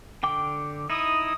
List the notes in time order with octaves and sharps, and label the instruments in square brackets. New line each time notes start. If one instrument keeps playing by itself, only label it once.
[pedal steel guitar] D3 G5 D6
[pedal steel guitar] D#4 E4 [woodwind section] D#6